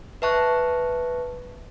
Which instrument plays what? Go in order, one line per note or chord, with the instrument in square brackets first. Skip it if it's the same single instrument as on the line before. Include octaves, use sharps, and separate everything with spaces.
[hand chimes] B4 E5 A5 C#6 F#6